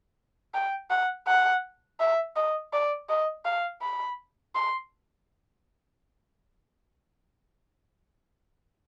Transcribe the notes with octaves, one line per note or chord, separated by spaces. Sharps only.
G5
F#5
F#5
E5
D#5
D5
D#5
F5
B5
C6